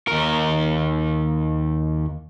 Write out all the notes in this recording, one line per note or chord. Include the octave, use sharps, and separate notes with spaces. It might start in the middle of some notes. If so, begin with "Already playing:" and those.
D#2 A#4